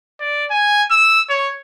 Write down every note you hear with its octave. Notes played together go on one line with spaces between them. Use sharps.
D5
G#5
E6
C#5